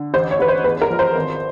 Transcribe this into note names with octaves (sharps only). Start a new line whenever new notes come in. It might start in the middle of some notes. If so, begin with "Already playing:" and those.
Already playing: D3
A1 C5
C#5
A1 B4
C5
E2 B4
A#4
F3
C5
G#1